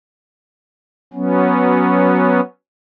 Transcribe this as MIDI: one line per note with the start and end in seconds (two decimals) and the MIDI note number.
1.14 2.41 54
1.14 2.41 59
1.14 2.41 61